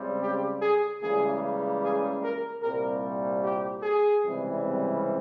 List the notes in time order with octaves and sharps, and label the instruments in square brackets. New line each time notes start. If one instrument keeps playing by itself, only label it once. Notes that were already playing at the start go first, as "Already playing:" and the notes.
Already playing: [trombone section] C#2 C#3 G3 C4
G4
G#4
C#2 C#3 E3 G3 A#3 G#4
G#4
A#4
C2 A#2 G3 C4 A#4
G4
G#4
C#2 C3 E3 G3 C4